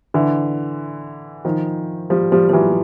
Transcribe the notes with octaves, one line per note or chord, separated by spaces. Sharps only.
D3 E3
D#3 F3
F3 G3
F3 G3
F3
E3 F#3